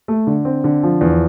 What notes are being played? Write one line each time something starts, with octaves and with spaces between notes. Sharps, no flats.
A3
D3
C4
D3
F3
E2